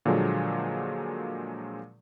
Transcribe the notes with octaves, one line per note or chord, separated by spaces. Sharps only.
A#2 D3 F3 F#3 G#3 A#3